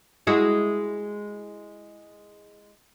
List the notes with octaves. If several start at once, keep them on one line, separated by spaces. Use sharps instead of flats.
G#3 E4 F#4